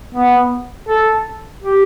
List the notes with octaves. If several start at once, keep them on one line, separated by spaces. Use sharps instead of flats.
B3
A4
G4